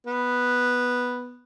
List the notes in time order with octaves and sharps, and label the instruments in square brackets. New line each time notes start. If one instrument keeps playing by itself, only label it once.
[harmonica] B3